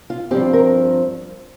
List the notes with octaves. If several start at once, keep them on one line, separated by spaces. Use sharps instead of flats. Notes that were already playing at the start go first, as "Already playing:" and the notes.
F4
G2 F3 C4 G4
A#4